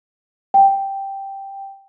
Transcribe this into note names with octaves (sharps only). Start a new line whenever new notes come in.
G5